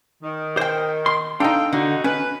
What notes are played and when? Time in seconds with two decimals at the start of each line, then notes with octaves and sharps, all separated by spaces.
0.23 D#3
0.57 C5 G5
1.06 C6
1.40 D4 D#4 A4 F5 G5
1.73 D3 D#4 F#4
2.04 C#4 B4